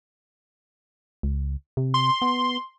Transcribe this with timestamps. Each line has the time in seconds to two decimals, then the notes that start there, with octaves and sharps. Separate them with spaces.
1.23 C#2
1.77 C3
1.94 C6
2.22 B3